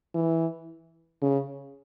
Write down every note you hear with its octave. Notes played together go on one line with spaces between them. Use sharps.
E3
C#3